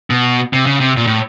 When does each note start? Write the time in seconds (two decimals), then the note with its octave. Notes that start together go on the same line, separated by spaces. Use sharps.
0.10 B2
0.53 C3
0.66 C#3
0.80 C3
0.97 A#2
1.07 A2